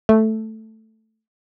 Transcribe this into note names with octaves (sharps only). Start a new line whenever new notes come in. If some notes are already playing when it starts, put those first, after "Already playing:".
A3